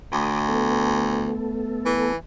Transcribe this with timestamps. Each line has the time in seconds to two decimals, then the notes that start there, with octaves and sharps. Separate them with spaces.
0.12 D2 A3 B5 D6 D#6
0.49 B3 A4
1.85 E3